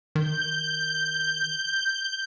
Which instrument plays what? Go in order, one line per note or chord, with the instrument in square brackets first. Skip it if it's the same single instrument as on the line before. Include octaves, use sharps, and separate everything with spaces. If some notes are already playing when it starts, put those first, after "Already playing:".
[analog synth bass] D#3 [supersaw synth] G6